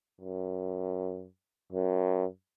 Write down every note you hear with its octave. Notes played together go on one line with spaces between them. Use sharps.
F#2
F#2